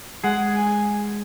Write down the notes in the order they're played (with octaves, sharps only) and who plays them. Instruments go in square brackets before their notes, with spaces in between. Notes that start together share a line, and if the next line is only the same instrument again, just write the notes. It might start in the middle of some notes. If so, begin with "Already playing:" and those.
[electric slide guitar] G#3 G#4 [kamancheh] F#5
[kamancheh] G#5